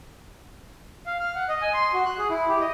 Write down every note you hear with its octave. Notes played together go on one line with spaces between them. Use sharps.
F5
F6
F#5
D#5
G#5
C6
F#4
F#6
G#4
E4
G4
D#5